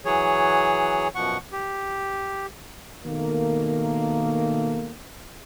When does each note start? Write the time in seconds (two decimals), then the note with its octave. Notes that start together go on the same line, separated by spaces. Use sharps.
0.05 E3 F#3 G#4 C#5
1.15 F#2 B2 F3 F#5 C#6
1.52 G4
3.05 B2 D#3 A3 A#3